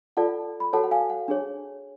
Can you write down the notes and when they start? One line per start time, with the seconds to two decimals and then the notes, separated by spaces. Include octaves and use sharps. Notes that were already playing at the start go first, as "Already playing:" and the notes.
0.17 F4 A4 D5 F#5 A5
0.60 B5
0.73 F#4 A4 C#5 F#5 A5
0.83 F#5
0.91 F5 G#5
1.10 F#5
1.28 D4 G#4 C#5